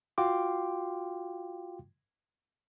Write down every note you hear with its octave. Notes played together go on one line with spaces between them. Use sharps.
F4 F#4 F5 G5 C6 D6